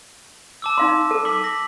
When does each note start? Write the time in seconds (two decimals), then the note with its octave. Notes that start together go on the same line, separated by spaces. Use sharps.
0.62 A5 D6 E6
0.78 D#4 F5 C6
1.11 A4
1.25 D6 B6 F#7
1.44 A#6